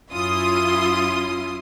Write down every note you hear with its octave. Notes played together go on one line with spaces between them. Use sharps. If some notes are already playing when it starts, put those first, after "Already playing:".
F#2 C#4 E4 F4 C6 D#6